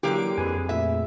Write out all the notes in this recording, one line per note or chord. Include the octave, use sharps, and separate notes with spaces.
D3 E3 F#3 A#3 G4 D7
F2 G#4 B4 G#5
A#2 A3 E5